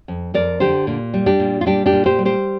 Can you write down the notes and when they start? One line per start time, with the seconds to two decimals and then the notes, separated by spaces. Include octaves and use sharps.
0.08 F2
0.34 F2 A#4 D5
0.60 D3 G4 C5
0.87 A#2
1.14 G3
1.26 D4 G4
1.40 A#2
1.61 F4
1.66 G3 D4 G4
1.86 D4 G4
1.92 A#2
2.06 G4 C5
2.19 G3
2.25 G4 C5